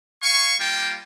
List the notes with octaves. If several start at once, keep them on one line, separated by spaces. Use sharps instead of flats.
F5 G#5 C#6
G3 A#3 F4 G5